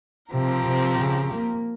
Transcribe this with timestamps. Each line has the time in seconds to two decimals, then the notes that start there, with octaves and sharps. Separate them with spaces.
0.32 C3 F3 C4 G4 A#4
0.66 C3
1.00 C#3
1.34 A#3